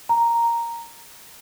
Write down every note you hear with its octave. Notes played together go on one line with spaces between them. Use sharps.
A#5